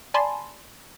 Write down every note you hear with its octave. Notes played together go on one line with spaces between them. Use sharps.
D5 G#5 A5 B5 C6